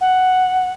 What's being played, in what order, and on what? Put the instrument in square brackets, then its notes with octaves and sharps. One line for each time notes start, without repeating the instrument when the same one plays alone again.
[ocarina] F#5